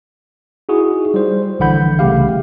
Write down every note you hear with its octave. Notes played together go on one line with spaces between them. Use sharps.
D#4 E4 F#4 G#4
G3 C5
A#1 D3 E3 F#5 B5 G6
C2 C#3 A3 G4 F5